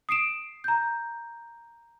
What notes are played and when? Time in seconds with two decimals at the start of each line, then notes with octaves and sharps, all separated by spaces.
0.09 D#6 C7 D7 E7
0.64 A#5 G6